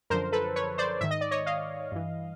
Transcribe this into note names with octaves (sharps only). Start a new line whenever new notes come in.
F#2 D3 F3 A#4 C5
A4 B4
B4 C#5
C5 D5
G#2 D#3 E5
D#5
D5
C#5 D#5
D#5 F5
G2 E3